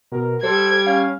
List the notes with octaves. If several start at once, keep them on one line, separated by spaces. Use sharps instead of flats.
B2 A#4
G3 A4 C5 G#6
C#4 F5